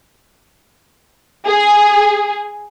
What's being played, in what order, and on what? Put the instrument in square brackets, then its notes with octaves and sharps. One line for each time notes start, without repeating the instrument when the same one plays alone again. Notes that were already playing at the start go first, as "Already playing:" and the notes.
[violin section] G#4